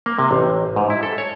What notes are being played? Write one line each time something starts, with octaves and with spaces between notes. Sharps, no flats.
A#3
C3
A1
G#2
E4
A4
C#5